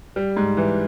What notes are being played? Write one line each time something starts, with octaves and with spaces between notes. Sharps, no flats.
G3
G#2
E3